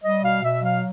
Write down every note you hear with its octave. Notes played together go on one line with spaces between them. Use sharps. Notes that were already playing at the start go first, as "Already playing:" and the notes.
G3 D#5
B2 F5
B2 E5
F#3 F5